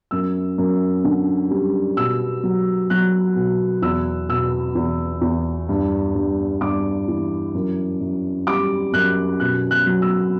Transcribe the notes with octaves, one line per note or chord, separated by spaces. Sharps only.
F#2 E6
F#2
D3
G3
B2 E6
F#3
F#3 F#6
B2
E2 E6
B2 E6
E2
E2
G2
G2
G2 D6
E3
F#2
F#2
G3 D6
F#2 F#6
B2 F#6
F#6
F#3
E6